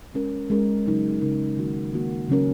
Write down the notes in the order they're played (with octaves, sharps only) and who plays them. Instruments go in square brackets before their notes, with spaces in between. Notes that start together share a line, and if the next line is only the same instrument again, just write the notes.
[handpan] G#3 C#4 A#4
G#3 C#4 A#4
C#3 F#3 D#4 A#4
C#3 F#3 D#4 A#4
D#3 F#3 A#3 F#4
D#3 F#3 A#3 F#4
C#3 F#3 C#4 A#4